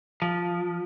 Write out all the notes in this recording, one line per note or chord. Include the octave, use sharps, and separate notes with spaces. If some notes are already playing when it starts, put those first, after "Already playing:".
F3